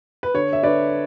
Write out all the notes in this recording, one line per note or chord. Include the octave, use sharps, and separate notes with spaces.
B4
D3 C#5
E5
D3 B4 D5